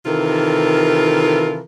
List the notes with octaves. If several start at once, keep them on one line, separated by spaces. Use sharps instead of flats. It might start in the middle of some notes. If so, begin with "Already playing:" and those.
C3 D#3 E3 F4 A4 A#4